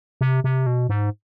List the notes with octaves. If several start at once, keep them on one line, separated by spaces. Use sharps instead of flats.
C3
C3
B2
G#2